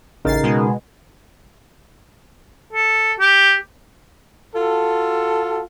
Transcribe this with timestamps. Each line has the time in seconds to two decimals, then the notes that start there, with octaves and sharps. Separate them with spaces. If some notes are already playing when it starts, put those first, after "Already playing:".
0.25 A1 C#3 D#4 A#4 A6 C7
0.43 B2 G#3
2.73 A4
3.20 G4
4.55 F4 F#4 A4